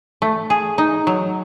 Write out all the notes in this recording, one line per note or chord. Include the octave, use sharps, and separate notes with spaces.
A3
G#4
D#4
F#3